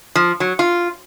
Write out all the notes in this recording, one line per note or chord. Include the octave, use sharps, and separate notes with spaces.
F3
F#3
F4